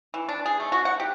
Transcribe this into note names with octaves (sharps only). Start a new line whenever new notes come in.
E3
D4
G#4
A3
F#4
F#5
G4